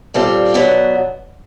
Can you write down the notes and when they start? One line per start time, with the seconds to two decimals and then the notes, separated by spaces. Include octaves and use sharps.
0.14 A#2 G3 C4 F4 A4
0.54 B2 F#3 B3 D4 F#4